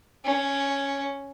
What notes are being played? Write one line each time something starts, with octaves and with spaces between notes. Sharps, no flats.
C#4